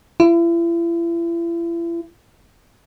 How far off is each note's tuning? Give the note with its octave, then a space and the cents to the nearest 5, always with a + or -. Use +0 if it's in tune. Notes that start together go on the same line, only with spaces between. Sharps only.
E4 +40